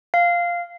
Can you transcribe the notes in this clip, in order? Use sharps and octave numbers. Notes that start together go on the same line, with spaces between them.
F5